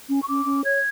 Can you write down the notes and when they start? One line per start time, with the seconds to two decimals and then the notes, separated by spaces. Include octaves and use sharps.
0.09 C#4
0.20 C#6
0.27 C#4 D6
0.46 C#4
0.64 C#5 G#6